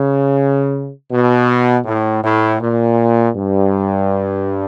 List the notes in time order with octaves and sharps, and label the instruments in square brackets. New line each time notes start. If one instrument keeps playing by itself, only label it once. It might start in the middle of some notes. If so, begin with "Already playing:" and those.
Already playing: [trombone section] C#3
B2
A2
A2
A#2
G2